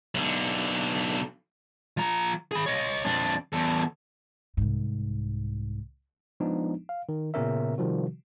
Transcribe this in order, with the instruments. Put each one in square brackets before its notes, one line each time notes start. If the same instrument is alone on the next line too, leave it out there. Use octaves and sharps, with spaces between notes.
[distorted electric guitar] B1 D3
F3 A#5
G#4 B5
C#5 D#5
F2 D4
E2 A4
[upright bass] C2 G#2
[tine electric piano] F3 G#3 B3 D4 D#4
F5
D#3
A#2 C#3 B3 C#4 A#4 E5
C3 D#3 F3 G3 F#4